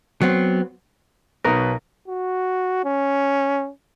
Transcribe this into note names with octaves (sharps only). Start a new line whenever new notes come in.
F#3 B3 C4
B1 B2 D#4 A#4 B4
F#4
C#4